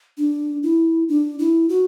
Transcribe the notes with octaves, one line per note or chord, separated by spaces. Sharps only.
D4
E4
D4
E4
F#4